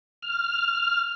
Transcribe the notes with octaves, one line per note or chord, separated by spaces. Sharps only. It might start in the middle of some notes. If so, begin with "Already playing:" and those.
F6